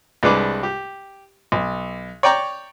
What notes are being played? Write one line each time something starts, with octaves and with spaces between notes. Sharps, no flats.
C2 G#3 D4 B4 D6
G4
B1
C#5 D5 G5 A#5 C#6 D6